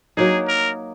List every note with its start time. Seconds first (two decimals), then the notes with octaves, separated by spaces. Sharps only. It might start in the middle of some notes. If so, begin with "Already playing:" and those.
0.17 F#3 A#3 D#4 G#4
0.48 A#4